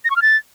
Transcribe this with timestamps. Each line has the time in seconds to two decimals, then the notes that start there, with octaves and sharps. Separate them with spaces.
0.05 A#6
0.10 C#6
0.16 F6
0.22 A6